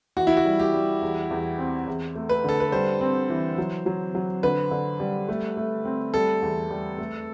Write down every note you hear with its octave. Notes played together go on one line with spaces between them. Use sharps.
E3 F#4
E4
F#4
G3
G4
G3
E2
E2
C4
E2
A3
B4
D3 A4
B4
G3 C5
C4
E3
F#3
F#3
F#3
D3 B4
D3
G3
A3
A3
C4
G3 A4
E2
G3
A3